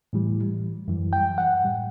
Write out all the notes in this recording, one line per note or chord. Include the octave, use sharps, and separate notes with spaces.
A2 E3 G3
F#2 E3 G3
G5
F#5
A2 G3